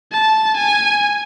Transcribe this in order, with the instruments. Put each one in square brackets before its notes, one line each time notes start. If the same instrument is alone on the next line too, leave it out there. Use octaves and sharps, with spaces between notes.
[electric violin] A5
G#5